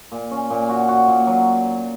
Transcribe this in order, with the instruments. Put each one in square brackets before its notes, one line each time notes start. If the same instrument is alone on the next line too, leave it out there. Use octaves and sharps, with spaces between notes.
[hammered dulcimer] A#2
C#4
A#2
F#4
F#4
A#2
F#3